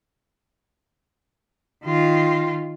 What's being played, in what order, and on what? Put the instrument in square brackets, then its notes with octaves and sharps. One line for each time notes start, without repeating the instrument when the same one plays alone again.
[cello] D#3 F4